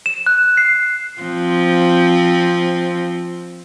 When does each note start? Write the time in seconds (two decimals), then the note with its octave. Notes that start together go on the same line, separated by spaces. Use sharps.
0.06 E7
0.26 F#6
0.57 C7
1.22 F3 C4